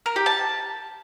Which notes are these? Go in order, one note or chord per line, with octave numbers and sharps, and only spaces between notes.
A#4
G4
A5